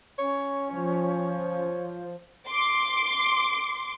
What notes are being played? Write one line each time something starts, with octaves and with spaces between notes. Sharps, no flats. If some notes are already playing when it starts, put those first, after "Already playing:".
C#4 C#5
F3 C#5
C6 D6